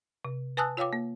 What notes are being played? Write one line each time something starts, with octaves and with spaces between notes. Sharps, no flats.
C3
B4 G#5 A5 D#6 E6 F#6
F4 C#5 F5 G5 D6
A#3